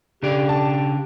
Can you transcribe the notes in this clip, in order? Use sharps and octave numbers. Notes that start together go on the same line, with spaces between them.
C#3 D4 G4
A5